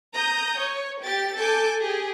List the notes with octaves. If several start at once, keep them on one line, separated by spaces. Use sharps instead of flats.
A#5 D#6 G6
C#5
G4 A6
A4 G#5 A5 D6 G6
G4 G#4